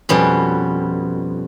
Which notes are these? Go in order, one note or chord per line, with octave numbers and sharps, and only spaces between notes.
F2 B2 G3 B3 C#4